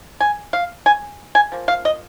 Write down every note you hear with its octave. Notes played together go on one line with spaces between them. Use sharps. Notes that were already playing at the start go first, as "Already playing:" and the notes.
G#5
F5
G#5
G#5
F3 A#3
F5
D#5